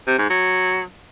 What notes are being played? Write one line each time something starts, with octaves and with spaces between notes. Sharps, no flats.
C3
G#2
F#3